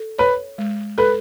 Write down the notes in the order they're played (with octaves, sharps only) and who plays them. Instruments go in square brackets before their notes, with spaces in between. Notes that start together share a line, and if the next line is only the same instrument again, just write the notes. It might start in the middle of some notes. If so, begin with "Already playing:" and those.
Already playing: [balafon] A4
[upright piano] B4 [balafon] C#5
[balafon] G#3
[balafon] A4 [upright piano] B4